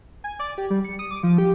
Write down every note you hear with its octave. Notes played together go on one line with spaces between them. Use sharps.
G#5
D5
G4
G3
C#7
D#6
D6
F3
G4